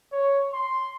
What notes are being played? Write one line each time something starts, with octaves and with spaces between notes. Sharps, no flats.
C#5
C6